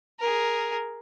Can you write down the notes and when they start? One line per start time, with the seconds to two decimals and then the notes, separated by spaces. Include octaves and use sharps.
0.20 G#4 A#4